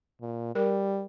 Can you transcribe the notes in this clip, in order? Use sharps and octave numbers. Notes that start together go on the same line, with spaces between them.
A#2
G3 A#4